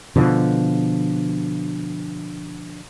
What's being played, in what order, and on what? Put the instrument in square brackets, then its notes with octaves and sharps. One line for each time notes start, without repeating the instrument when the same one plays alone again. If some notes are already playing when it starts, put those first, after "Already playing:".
[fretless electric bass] B2 D3 F3